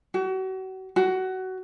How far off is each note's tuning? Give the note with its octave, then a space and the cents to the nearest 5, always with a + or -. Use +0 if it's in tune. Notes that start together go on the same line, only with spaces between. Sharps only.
F#4 +35
F#4 +20